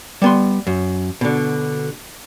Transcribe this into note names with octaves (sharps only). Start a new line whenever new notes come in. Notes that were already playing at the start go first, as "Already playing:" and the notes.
G3 B3 C6
F#2
B2 D3